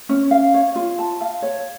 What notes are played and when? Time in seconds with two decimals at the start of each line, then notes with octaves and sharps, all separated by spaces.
0.09 C#4
0.31 F5
0.54 C#5
0.76 F4
0.98 A5
1.21 F5
1.42 C#5